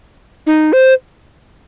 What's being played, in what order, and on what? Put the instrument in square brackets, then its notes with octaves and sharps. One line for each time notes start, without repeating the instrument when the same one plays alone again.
[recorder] D#4
C5